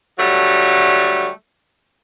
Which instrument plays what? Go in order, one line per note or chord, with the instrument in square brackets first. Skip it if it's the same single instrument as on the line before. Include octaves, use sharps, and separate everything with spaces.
[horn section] D3 F#3 G3 A3